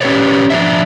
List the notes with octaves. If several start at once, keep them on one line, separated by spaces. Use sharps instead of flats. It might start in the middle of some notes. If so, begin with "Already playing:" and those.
C#4 G4 A#4 B4 C#5 D5
F3 D4 E5